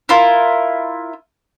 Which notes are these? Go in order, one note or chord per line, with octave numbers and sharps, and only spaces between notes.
E4 F4 A#4